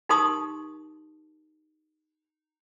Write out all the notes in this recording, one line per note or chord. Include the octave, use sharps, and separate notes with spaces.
D#4 G4 A#4 A5 C6 D#6